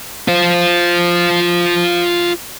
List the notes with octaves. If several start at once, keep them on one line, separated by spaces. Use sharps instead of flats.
F4 C5